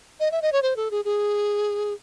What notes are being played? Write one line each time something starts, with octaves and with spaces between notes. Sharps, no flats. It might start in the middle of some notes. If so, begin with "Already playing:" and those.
D#5
E5
D#5
C#5
C5
A4
G#4
G#4